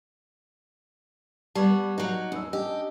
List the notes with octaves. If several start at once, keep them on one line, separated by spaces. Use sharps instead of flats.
G3 B3 A5 C#6 G#6
F#3 D#4
E2 C#4 E6
C#4 D4 G4 D#5